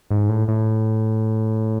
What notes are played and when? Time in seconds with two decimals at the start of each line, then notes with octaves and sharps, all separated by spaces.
0.10 G#2
0.29 A2
0.48 A2